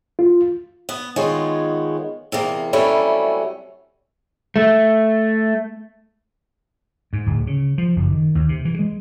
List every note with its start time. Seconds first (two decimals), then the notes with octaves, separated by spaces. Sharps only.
0.19 F4
0.89 B3
1.16 D#3 G#3 B3 F4 C#5
2.32 E2 C3 A#3
2.73 C3 F#3 G3 A3 C#4 E4
4.56 A3
7.13 G#2
7.26 D1
7.47 C#3
7.78 F3
7.96 F#1
8.10 D#3
8.35 D#2
8.49 C3
8.65 E3
8.79 G#3